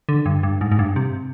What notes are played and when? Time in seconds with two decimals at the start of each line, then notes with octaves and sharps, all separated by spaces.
0.09 D3
0.26 G2
0.43 G2
0.61 G#2
0.72 G#2
0.79 G2
0.96 C3